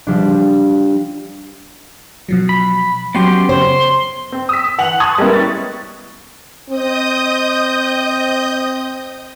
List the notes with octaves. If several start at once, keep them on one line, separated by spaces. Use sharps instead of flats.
F3 G3 D4
B2 F3 F#3
B5
F#3 B3 C#4 G4 G5 C6 C7
C#3 C5 C6
C4
D#6 E6 B6
E3 F#5 F7 F#7
A5 C6 C#6 D#6 F#6 G#6
G3 G#3 A#3 B3 C#4 E4
C#6 A6
C4 D#5 D#6 G6